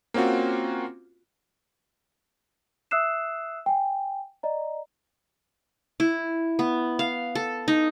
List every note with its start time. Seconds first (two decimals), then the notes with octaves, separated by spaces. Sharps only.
0.14 A#3 C4 C#4 F4 F#4
2.91 E5 D#6 E6 F#6 C7 E7
3.66 G5 G#5
4.43 D5 D#5 A#5
6.00 E4
6.59 B3
6.99 F5
7.35 A4
7.68 D#4